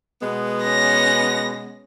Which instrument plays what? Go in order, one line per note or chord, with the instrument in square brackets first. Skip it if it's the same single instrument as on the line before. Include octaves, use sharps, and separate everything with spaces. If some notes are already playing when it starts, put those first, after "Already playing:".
[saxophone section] B2 G#3 B3
[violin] C#4 A#6